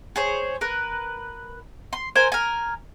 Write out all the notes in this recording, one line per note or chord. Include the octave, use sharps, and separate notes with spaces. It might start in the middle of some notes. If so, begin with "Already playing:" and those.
G#4 C5 C#5
A#4 B4
C6
A#4 C5 G#5
A#4 G#5